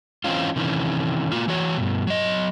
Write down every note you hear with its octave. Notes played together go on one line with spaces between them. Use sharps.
E3 C4 C#4 F4
C3 D#3 E3 C#4
A#3 F4 F#4
E3 F#4 C#5
G2 B2
F#3 D#5